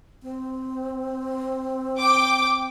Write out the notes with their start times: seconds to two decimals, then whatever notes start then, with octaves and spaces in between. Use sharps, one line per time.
0.23 C4
1.99 G5 D6